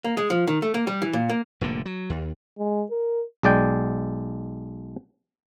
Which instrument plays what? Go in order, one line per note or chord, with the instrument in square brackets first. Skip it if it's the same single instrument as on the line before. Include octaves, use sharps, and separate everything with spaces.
[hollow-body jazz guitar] A#3
G#3
F3
D#3
A3
A#3
G3
E3
A#2
A#3
[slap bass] F1 A2 D3 A#3
F#3
D#2
[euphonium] G#3
A#4
[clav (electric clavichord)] B1 G#3 D5 G5